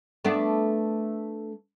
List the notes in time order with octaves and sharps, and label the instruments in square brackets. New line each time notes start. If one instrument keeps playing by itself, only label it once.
[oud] A3 B3 D4